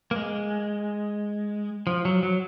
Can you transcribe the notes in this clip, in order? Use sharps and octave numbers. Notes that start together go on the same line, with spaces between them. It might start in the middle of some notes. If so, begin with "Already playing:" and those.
A#3
G#3
F3
F#3
F#3